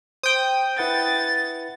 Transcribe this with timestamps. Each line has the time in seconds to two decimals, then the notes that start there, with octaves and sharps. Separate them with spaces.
0.23 C5 G5 D#6
0.78 E4 B4 F#5 A6